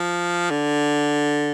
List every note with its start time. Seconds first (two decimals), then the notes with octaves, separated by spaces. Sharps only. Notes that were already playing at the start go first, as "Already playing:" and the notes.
Already playing: F3
0.50 D3